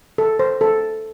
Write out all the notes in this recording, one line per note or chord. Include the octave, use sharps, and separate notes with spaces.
A4
C5
A4